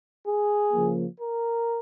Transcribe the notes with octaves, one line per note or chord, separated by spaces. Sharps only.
G#4
C#3 F3 A#3
A#4